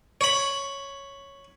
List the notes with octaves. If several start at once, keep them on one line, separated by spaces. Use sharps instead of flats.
C#5 B5